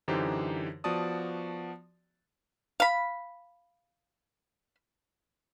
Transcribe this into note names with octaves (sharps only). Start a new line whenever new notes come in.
F#2 D3 E3 D#4 G4 C5
F3 B3 F#4 D5 A5 D#6
F5 B5